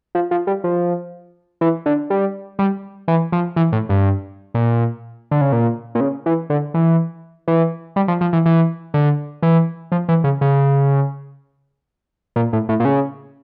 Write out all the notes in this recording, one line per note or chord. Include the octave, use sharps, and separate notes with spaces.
F3
F3
G3
F3
E3
D3
G3
G3
E3
F3
E3
A2
G2
A#2
D3
C#3
A#2
A#2
C#3
E3
D3
E3
E3
G3
F3
F3
E3
E3
D3
E3
F3
E3
C#3
C#3
A#2
A2
A2
A#2
C#3